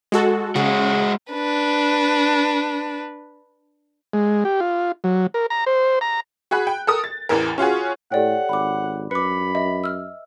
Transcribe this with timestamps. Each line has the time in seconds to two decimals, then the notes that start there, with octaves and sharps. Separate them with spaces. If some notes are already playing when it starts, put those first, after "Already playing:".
0.12 G#3 F#4 A4
0.56 C#3 G#3 F#4
1.32 D4 B4
4.13 G#3
4.45 G4
4.60 F4
5.04 F#3
5.34 A#4
5.50 A#5
5.66 C5
6.01 A#5
6.51 F#4 G#4 B5 F#6
6.67 G5
6.87 A4 A#4 D#6
7.04 A6
7.29 A1 E2 E3 A#4
7.58 C#4 F4 F#4 G#4
8.12 A2 G4 A4 C#5 D5 F#5 G5
8.49 G#1 B5 D6
9.11 F#2 B4 B5 D6 C#7
9.55 D#5 E5
9.84 E6 F6